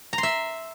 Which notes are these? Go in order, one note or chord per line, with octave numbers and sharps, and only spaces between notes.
A#5
C6
E5